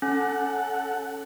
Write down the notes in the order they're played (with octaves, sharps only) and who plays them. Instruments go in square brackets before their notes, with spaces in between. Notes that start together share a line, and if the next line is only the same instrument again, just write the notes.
[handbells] C#4 [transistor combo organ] A4 F#5